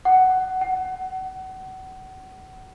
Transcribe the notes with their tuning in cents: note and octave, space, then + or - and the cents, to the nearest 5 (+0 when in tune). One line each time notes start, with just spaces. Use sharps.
F#5 +10
F#5 +30